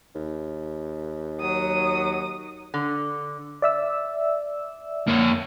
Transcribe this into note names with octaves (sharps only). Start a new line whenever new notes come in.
D#2
F#3 D#6
D3
D5 E5 E6
A#3 C#5